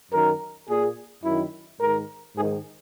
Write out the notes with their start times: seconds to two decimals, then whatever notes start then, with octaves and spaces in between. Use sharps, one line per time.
0.11 F#2 D#3 A#4
0.68 A#2 G#4
1.24 F#2 D#3 E4
1.81 G#2 D#3 A#4
2.37 G#2 G#4
2.42 D#3